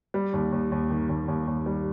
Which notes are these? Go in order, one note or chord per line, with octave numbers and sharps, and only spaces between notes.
G3
D#2
D#2
D#2
D#3
D#2
D#2
D#2
G3